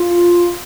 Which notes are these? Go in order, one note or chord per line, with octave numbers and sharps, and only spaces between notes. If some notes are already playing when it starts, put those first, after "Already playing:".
Already playing: F4